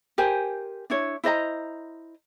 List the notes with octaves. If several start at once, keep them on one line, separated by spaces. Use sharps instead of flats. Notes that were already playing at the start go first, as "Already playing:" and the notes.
G4 A#4 C5 G#5
D4 E4 C#5
E4 C5 D#5 A#5